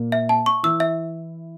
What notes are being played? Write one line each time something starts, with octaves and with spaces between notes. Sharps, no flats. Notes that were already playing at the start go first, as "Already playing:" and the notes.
Already playing: A#2 A#3
E5
A5
C#6
E3 E4 E6
E5